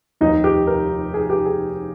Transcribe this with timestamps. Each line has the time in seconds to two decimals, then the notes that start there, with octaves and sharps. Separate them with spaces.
0.21 F1 D#2 D#3 D#4
0.44 G4
0.67 A#4
1.14 G#4
1.30 G4
1.46 G#4